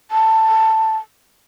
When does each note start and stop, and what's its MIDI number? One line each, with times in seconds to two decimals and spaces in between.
0.11 0.97 81